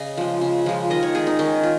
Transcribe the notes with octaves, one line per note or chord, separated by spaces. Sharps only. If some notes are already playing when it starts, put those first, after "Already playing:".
Already playing: C#3 D#5
F3 G#3
C#3
F3 G#3
D#3 D#5
C#5
G#3 G#4
D#4
D#3 C#4
F4